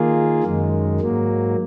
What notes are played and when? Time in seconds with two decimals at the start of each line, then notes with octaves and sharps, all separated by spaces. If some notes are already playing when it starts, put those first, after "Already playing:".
Already playing: D#3 A#3 F4 G#4
0.43 F#2 D#3 G#3
1.00 G#2 F#3 A#3